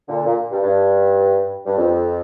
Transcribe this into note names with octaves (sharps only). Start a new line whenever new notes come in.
A#2 D3
A#2
G2
G2
G2
F2